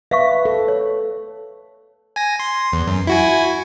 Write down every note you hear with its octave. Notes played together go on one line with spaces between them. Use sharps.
B4 E5 F5 C#6
A4
C#5
G#5 A#6
C6
E2
F#2
E4 F#4 G#5